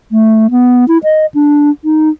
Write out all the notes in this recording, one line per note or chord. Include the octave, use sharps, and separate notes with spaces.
A3
B3
E4
D#5
D4
D#4